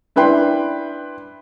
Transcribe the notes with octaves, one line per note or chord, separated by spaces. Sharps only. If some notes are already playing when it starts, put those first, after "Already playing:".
D4 E4 B4 G5 C6